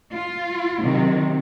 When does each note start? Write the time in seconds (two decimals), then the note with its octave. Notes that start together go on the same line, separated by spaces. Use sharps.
0.13 F4
0.81 C3 D#3 F#3